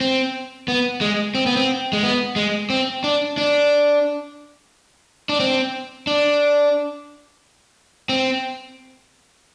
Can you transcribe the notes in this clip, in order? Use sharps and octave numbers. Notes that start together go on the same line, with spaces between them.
C4
B3
G#3
C4
B3
C4
G#3
B3
G#3
C4
D4
D4
D4
C4
D4
C4